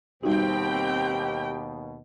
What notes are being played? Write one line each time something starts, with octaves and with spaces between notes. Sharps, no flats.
D#2 B2 G3 C4 D#4 F#4 G4 G5